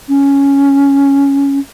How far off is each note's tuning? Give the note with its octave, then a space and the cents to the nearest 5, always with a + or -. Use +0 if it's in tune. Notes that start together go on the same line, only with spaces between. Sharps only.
C#4 +5